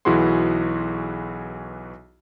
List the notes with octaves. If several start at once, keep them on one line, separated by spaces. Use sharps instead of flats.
B1 E3 E4 F#4 G#4 C6